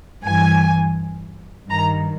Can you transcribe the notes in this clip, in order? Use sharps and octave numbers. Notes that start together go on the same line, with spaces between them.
G2 E3 G#5
G2 D#3 A#5